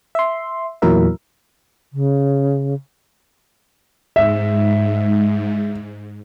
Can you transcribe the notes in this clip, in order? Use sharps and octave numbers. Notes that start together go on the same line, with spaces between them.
E5 C6
E2 A#2 F#3 E4 A#4 E5
C#3
G#2 E5